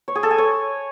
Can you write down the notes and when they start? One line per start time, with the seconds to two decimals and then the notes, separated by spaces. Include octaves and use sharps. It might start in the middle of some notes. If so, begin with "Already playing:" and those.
0.08 C#5
0.15 G#4
0.23 A4
0.31 G#5
0.38 C#5